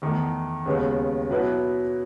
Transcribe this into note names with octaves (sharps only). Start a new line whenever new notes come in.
E2 D#3 A3
D#2 C#3 G#3 B3
B2 F#3 B3 E4 B4